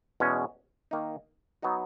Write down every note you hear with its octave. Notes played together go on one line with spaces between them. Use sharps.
E2 B2 G#3 C#4
D#3 A#3 D#4
F#3 B3 D#4 F#4